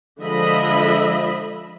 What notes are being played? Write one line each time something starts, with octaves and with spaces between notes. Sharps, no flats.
D3 F3 G#3 D#5 E5 B5